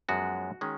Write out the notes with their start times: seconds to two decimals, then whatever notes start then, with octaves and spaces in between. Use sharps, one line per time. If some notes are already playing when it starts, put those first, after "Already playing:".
0.08 F#2 F3 G#3 B3 F#4
0.61 D#3 G#3 C#4